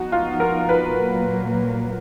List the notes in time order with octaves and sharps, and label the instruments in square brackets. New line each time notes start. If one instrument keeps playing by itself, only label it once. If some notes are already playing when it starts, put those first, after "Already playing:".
Already playing: [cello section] F3 B3 D#4 [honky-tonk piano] F#4
[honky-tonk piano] F4
A#4
B4
[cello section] A#2 F#3 A#3